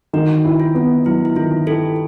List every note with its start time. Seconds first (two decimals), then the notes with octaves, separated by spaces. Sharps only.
0.13 D#3 F#4
0.44 E4
0.60 F4
0.75 B3
1.06 F#3 E4
1.25 E4
1.36 D#3 F4
1.67 E4 G4 A4